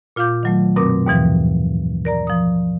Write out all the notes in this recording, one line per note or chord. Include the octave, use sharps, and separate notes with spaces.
A#2 F4 F5 D6 G6
D#3 F#3 A3
F#2 B2 C4 A#4 D6
D#2 G#2 B2 E3 F3
A#4 D5 A#5
F3 D#6